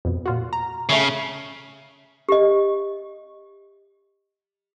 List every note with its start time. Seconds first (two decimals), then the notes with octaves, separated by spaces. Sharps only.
0.05 F2 B2
0.26 A#2 F4 F#4
0.53 A#5
0.89 C#3 A3 C#5 E5
2.29 G4 D#5